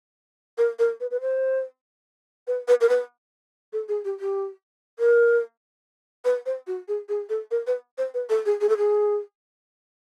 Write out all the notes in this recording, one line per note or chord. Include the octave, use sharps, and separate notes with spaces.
A#4
A#4
B4
B4
C5
B4
B4
A#4
B4
A4
G#4
G4
G4
A#4
B4
C5
F#4
G#4
G#4
A4
A#4
B4
C5
B4
A4
G#4
G#4
A4
G#4